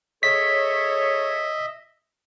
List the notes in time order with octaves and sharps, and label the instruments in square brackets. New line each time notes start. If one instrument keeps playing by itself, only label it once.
[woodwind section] G#4 A4 C#5 [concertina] D#5 E5 [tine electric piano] B6